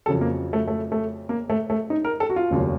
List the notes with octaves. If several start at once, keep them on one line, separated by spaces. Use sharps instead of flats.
F2 C#3 F#3 A4
A#3
A3
A3
A3
A#3
A3
A3
D#4
A#4
A4
F#4
F4
F1 D#2 C#3 F#3